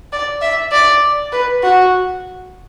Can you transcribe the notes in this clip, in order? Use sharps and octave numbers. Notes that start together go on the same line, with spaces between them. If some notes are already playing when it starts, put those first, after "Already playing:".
D5
E5
D5
B4
F#4